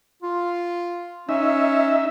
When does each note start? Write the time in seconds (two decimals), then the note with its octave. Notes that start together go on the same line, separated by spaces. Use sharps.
0.22 F4
1.29 C#4 D#4 E5